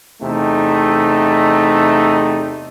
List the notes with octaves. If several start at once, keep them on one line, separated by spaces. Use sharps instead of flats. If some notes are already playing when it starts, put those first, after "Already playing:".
E2 C3 A3 D#4